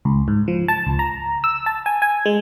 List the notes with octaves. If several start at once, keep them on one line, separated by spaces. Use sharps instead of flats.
C#2
G#2
F3
A5
C#2
A#5
E6
A5
G#5
G#5
G#3